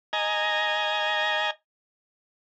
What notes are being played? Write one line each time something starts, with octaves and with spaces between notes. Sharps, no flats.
D#5 G#5 A#5